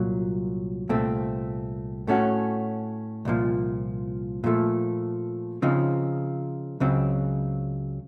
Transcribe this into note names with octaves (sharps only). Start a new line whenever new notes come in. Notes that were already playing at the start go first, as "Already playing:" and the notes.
Already playing: C2 A#2 F#3
C2 A#2 A3 C4
A2 A3 C#4 F#4
C2 A#2 F3
A#2 F3 A3
C#3 F3 C4 D#4
C#2 C#3 F#3 C4